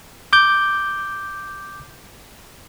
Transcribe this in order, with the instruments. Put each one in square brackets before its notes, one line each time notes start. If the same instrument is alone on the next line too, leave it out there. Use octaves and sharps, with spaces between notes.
[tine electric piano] D6 G6